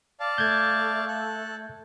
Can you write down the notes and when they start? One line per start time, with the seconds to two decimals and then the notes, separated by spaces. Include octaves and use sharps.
0.20 D5 F5 A5
0.38 A3 G6 G#6
1.08 A4 F#6